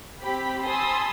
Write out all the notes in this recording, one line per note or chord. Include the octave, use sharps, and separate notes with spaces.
C4 G4 B5 B6
G#5 A5 B5 C6 D#6 E6